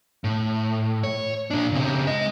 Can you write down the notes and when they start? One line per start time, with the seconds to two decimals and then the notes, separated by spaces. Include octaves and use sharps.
0.24 A2
1.03 C#5
1.51 A#2 D4
1.72 C#3 C4
2.07 G#3 D#5